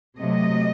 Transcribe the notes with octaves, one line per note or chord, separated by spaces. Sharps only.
C3 F#3 A3 D#5